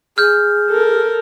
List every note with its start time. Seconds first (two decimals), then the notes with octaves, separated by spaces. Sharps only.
0.18 G#4 F6 G6
0.70 A4 A#4